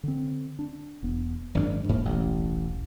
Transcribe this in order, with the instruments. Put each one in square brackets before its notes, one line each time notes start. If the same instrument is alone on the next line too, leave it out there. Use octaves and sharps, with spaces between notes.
[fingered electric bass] D3 C4
D4
E1 B3
[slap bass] G#1 C#4 D4 [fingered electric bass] F#2
[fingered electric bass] D#1 B1 [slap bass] G#2 A#3
[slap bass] A1